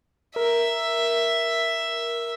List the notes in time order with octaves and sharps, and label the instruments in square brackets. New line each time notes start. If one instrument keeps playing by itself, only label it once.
[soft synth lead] A#4 [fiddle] E5